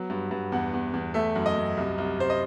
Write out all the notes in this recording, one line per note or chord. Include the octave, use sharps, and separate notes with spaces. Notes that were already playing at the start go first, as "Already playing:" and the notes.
Already playing: F#3 B3
G2
G2
E2 F#5
E2
E2
A3 E5
F#2
D#5
F#2
C2
C2
C2 C5
D#5